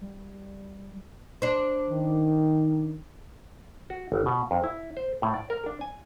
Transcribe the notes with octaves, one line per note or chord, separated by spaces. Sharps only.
G3
D4 C5
D#3
F#4
G1
B2
F2
E4
C5
A2
D5
A#4
D4
G#5